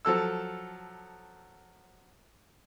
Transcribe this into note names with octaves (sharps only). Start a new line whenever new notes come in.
F3 F#3 A4 E6